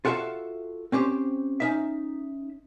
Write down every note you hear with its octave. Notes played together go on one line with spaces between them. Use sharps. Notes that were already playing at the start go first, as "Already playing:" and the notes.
F4 F#4 A4 C#5 E5 F5
C4 C#4 G4 C5
C#4 D#4 E5